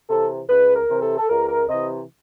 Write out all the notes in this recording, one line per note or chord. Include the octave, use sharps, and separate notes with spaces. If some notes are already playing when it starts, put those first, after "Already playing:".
C3 E3 A4
C#2 B4
A#4
C3 E3
A4
A4
C#2 A#4
A#4
C3 E3 D#5